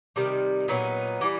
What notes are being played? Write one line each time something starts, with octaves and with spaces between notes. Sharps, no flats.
C3 D#3 G3
A#2 F#3 B3 D#4
E3 G3